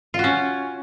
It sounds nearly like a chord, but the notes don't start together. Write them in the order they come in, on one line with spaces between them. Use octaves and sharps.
F4 F#4 C#4